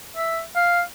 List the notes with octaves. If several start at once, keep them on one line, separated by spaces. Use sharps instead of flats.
E5
F5